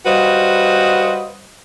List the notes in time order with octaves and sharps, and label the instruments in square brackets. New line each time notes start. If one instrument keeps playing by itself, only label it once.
[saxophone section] G3 F#4 B4 C5 D#5 F5